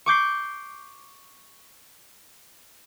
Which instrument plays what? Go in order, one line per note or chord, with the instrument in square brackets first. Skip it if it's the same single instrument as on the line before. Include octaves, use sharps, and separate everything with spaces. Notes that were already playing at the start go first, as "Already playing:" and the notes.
[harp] C#6 D6 G6 C7